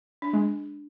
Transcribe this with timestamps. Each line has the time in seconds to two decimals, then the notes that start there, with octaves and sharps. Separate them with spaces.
0.22 D4
0.33 G#3